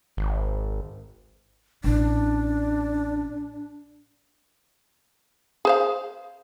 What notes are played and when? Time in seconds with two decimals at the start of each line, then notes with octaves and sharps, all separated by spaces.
0.17 G#1
1.84 A1 D4
5.65 G#4 C5 F5